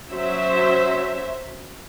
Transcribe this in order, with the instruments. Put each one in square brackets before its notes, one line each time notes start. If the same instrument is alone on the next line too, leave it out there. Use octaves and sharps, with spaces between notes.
[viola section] F#3 C#4 C5 E5